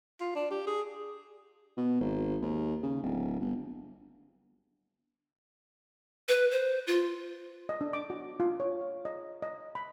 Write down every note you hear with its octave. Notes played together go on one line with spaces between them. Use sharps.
F4
D4
G4
G#4
B2
G#1
D#2
C#3
D1
G1
B4
C5
F4
D#5
D4
D6
F#4
F4
C#5
F5
D#5
D#5
B5